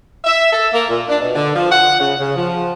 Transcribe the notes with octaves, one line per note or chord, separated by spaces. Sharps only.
E5
A4
A#3
A#2
D4
B2
D3
F3
F#5
C#3
C#3
F3